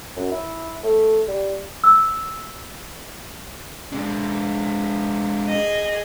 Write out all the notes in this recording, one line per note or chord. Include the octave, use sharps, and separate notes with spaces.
F#2
E4
A3
G3
E6
G#3 D4
G#4 D#5